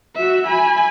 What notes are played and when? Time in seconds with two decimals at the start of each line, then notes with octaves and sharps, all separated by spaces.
0.16 F#4 E5
0.47 G#5 B5